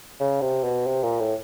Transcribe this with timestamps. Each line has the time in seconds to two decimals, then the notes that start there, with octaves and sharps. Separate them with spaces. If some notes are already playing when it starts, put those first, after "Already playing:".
0.20 C#3
0.42 C3
0.64 B2
0.87 C3
1.04 A#2
1.20 A2